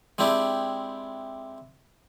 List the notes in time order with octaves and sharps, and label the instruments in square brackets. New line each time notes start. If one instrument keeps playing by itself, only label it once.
[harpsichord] G#3 C4 D4 E4 G4